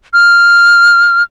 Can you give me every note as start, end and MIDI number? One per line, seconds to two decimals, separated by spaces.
0.13 1.23 89